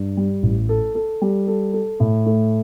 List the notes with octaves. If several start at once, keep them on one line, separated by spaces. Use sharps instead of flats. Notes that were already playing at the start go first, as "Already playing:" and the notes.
Already playing: G2
G3
A1
A4
A4
G3
A4
A4
A2
A3